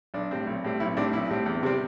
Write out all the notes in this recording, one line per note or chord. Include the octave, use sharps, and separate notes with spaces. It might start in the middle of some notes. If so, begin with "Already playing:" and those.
B1 D4
A2 G3 C4
B1
A2 G3 C4
B1 E4
A2 G3 C4 D4
B1 E4
A2 G3 C4
E2
C3 G3 C4